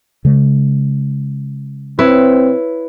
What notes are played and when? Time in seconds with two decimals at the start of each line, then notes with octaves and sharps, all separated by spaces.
0.25 C#3 G#3
1.99 C4 E4 B4 C#5